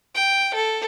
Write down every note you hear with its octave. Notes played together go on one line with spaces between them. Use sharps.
G5
A4